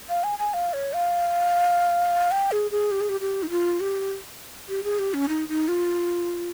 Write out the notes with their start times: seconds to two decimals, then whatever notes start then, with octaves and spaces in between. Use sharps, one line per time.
0.09 F5
0.23 G#5
0.39 G#5
0.53 F5
0.73 C#5
0.93 F5
2.31 G5
2.51 G#4
2.71 G#4
2.91 G4
3.01 G#4
3.09 G4
3.21 G4
3.43 D#4
3.50 F4
3.80 G4
4.69 G4
4.84 G#4
4.99 G4
5.14 C#4
5.29 D#4
5.48 D#4
5.68 F4